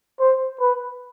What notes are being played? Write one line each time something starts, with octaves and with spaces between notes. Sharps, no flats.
C5
B4